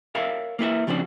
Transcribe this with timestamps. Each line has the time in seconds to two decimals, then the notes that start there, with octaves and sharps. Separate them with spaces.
0.15 A#4 C#5 E5 F5 B5
0.59 A#3 E4 B4 E5
0.87 C#3 F3 C4 D4 F#4